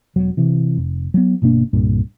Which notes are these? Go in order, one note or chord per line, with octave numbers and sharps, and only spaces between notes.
E1 F#3
C3 E3
F1
F#3 B3
G1 B2 A#3 D4
C2 G2 A#2